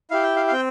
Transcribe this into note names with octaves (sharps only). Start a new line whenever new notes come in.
E4 G4 F5
G5
F5
F5
C4 G5